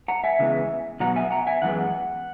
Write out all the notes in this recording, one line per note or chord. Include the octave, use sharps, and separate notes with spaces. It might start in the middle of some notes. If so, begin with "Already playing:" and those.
F#5 A#5
E5 G#5
C#3 E3 G#3 B3
B2 F#3 B3 F#5 A#5
E5 G#5
F#5 A#5
E5 G#5
F#2 E3 G#3 B3 F#5